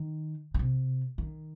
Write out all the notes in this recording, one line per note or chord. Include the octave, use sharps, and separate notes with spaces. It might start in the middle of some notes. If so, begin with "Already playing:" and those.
Already playing: D#3
D3
C3
D#3